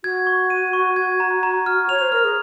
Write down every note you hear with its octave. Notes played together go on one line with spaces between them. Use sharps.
F#4 G#6
C#6
D#7
C#6
G#6
A#5
A#5
F6
C#5 F7
C5
A#4 F6
G#4